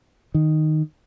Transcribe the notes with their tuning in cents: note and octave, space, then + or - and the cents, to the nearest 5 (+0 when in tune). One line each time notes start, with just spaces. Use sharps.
D#3 -5